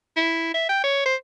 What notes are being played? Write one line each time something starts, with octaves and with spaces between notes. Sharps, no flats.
E4
E5
G5
C#5
C5